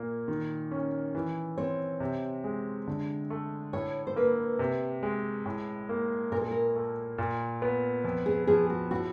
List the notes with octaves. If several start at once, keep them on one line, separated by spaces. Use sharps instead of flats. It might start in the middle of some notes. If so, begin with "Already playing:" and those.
Already playing: A#2 A#3
D#3
C#4
E3
C4 C#5
C3
G#3
D3
A3
A2 C#5
C5
A#3 B4
C3
G#3
A2
A#3
A#2 A#4
A4
A#4
A3
A#2
B3
F2
G#4
F3 G#4
F#4
A2 F#4